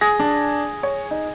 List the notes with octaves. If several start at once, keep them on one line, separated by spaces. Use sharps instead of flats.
G#4 A#6
D4
C#5
D#4